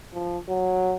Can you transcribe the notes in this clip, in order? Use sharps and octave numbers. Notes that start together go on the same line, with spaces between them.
F3
F#3